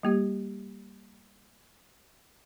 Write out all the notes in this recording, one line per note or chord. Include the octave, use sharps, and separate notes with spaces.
G3 A#3 G4